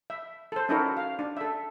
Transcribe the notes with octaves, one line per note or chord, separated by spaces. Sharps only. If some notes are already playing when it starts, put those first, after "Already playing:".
E5
A4 C5
C#4 D#4 E4 F#4 A4 A#4
F5
D4
A4 E5